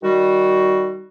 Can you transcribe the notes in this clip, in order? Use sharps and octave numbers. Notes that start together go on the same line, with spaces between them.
D#3 G3 F#4